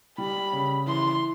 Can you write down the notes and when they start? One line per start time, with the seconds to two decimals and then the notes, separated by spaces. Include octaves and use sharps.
0.18 G3 B5
0.53 C#3
0.87 E3 C6